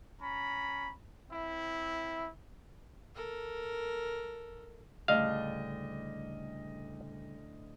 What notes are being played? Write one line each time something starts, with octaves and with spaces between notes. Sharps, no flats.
C#4 A#5 B5
C4 E4
A4 A#4
D2 A2 C#3 G3 D#5 F5 D#6